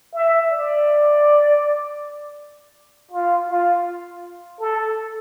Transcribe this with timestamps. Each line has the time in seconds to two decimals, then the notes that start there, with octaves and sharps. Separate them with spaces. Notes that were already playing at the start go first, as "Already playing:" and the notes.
0.14 E5
0.51 D5
3.12 F4
3.49 F4
4.60 A4